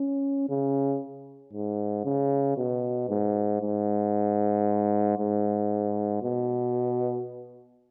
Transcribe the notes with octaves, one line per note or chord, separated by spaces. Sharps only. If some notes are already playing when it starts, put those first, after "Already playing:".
Already playing: C#4
C#3
G#2
C#3
B2
G#2
G#2
G#2
B2